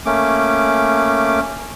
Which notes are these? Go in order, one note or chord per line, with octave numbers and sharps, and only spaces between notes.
A3 A#3 C#4 D6